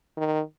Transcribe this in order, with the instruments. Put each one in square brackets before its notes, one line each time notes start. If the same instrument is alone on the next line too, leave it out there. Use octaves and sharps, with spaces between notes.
[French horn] D#3